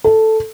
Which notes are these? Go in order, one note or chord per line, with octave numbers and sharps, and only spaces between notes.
A4